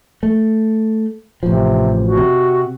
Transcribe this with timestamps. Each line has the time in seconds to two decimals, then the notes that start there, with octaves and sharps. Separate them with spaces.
0.23 A3
1.43 A1 C3 F3
2.03 F#4
2.17 C3